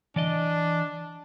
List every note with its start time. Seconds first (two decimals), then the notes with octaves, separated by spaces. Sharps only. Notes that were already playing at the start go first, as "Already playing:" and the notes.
0.16 E3 D4 D5 D#5